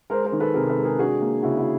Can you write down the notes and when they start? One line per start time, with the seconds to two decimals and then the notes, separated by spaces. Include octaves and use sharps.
0.10 G#3 A#4 C5
0.25 A#4 C5
0.32 D#3
0.40 A4 B4
0.54 C3 G#4 A#4
0.69 A4 B4
0.77 G#3
0.84 G#4 A#4
0.98 D4 F#4 G#4
1.21 A#3
1.43 C#3 E4 F#4
1.58 E4 F#4